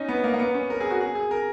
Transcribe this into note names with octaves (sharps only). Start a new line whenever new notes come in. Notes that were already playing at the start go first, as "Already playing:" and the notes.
Already playing: C#4 D#4
B3
A#3
A#3
B3
C#4
A#4
G#4
F#4
G#4
G#4
A#4